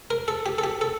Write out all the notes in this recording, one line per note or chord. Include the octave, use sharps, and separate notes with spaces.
A#4
A4
G4
A4
G4
A4